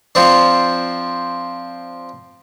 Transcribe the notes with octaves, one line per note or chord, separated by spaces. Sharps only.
F3 C4 D4